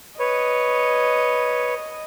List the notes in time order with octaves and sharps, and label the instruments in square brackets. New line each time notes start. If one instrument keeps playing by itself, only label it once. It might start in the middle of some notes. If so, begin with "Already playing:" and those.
[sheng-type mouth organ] B4 C#5 [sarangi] D#5